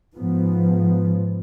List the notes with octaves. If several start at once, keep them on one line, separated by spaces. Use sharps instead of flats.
G#2 F3 B3